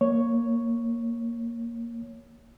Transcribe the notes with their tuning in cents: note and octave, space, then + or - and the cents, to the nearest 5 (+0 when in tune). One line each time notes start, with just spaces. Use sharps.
A#3 +0 C#5 +0